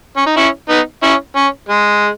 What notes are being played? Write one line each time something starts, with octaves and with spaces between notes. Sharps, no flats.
C#4
D#4
C#4 E4
B3 D#4
C#4 E4
C#4
G#3